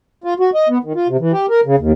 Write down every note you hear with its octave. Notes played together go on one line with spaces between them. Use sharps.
F4
F#4
D#5
B3
D#3
F4
C3
E3
G4
A#4
C#3
D#2